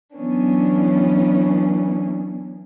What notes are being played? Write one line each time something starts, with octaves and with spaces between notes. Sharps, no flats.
E3 F#3 B3 C#4 D4